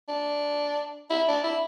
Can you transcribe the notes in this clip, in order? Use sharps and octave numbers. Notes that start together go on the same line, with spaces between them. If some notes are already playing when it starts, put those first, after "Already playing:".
D4
E4
D4
E4